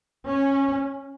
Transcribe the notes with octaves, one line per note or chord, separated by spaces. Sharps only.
C#4